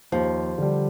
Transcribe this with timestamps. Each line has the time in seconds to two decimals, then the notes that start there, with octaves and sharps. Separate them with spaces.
0.12 D#2 F3
0.58 D3 G3